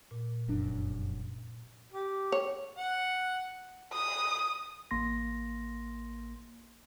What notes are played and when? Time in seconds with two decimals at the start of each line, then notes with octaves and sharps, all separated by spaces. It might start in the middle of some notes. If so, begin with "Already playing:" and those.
0.11 A#2
0.48 F1 F#2 D4
1.92 G4
2.32 C#5
2.78 F#5
3.93 D#6
4.91 A1 A#3 C6 A#6